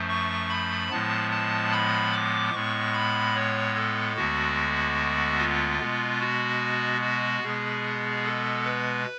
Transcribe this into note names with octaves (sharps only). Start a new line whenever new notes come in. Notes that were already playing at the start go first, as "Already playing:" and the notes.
Already playing: F#2 F3 A3
C#6
B5
A2 F3 G#3 B3 A5
A5
B5
D6
A2 G#3 B3 C#6
B5
C#5
A4
D2 D3 G#3 B3 F#4
F4
B2 G#3 B3
F#4
F#4
B2 G#3 B3 G#4
A4
B4